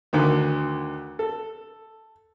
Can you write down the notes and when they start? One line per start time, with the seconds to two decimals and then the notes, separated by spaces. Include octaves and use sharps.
0.13 D2 D3 D#3
1.19 A4